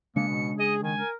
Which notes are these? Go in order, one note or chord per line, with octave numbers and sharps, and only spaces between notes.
C#3 G#3 A#3 D4 C#7
B2
G#4 D#5
D#3 G#5
A#4